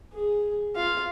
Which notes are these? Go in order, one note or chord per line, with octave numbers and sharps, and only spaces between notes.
G#4
F4 F5